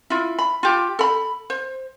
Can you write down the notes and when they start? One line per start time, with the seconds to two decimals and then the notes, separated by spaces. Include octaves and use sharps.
0.10 E4 F4
0.39 B5
0.63 F4 G4
0.99 A4 B5
1.50 C5